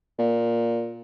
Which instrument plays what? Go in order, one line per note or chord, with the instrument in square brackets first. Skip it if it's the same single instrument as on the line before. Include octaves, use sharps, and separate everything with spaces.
[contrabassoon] A#2